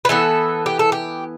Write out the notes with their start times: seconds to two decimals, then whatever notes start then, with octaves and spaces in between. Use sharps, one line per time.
0.05 B4
0.09 E3 B3 A4
0.66 G4
0.79 A4
0.92 G4